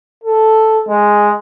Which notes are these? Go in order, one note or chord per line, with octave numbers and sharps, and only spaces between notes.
A4
G#3